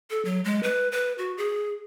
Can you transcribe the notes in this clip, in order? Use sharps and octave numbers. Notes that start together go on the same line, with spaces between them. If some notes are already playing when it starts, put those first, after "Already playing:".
A4
F#3
G#3
B4
B4
F#4
G#4